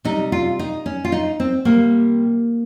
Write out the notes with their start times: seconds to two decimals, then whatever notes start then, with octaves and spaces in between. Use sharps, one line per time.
0.05 C3 G3 D#4
0.32 F4
0.59 D#4
0.86 C#4
1.05 F4
1.12 D#4
1.40 C4
1.65 C3 G3 A#3